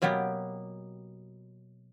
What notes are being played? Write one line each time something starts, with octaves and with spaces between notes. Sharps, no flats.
B2 F#3 A#3 B3 G4